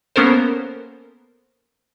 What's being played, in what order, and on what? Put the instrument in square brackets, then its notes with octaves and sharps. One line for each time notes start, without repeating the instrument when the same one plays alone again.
[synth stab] A#3 B3 C#4 A4 A#4 C5